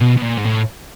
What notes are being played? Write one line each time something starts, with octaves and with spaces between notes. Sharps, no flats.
B2
B2
A#2
G#2
A2